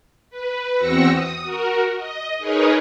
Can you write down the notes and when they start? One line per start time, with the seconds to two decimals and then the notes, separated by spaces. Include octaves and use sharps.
0.30 B4
0.76 E2 C4 F#4 E6 A#6 C#7
1.12 D#6
1.42 F#4 A#4
1.96 D#5
2.38 D#4 G#4 A#4 B4 C#5 D#5